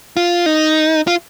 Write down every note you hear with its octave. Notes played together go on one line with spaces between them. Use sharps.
F4
D#4
F4